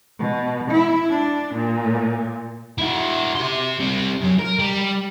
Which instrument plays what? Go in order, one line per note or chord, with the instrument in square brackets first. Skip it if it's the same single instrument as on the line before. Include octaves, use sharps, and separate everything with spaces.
[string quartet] B2
E4
D4
A#2
[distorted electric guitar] E4 F#4
G4 C6
G3 C4
F#2 F#3
A#4
G3